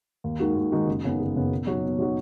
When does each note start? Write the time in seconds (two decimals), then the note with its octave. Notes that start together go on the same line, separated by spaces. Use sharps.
0.24 D#2
0.40 D#3 G#3 D#4 F#4
0.56 D#2
0.72 D#3 G#3 D#4 F#4
0.87 F#1
1.04 F#2 C#3 B3 D#4
1.20 F#1
1.36 F#2 C#3 B3 D#4
1.51 B2
1.67 F#3 D#4 F#4 C#5
1.84 B2
1.99 F#3 D#4 F#4 C#5